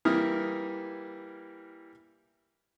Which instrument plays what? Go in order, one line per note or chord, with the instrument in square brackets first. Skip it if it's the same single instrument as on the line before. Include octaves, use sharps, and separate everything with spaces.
[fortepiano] E3 G3 A#3 E4 D#6 F6